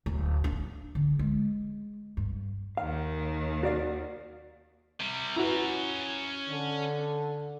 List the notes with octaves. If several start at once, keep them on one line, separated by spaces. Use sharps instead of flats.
D1
D4
D3
G#3
G2
D#2 D#3 F5
F#4 D5 F5
C3 G3
C#4 E4 F#4 B4 A#5
D3